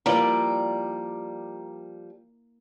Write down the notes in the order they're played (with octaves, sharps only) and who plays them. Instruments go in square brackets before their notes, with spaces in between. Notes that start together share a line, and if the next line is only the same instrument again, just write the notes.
[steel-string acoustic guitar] F3 G3 D5 [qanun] A#3 E4 [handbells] A#5